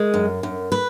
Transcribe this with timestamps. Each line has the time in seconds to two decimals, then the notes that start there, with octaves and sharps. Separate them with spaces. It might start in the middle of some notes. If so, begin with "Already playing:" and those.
Already playing: G#3 A#4
0.14 F#2
0.43 F#2
0.72 B4